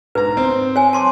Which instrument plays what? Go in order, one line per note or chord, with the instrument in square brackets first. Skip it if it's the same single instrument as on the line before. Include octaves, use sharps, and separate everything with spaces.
[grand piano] G#2 A#5 [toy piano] B4
[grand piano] C4 C5
[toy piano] C#5 G#5
A5 C6 D6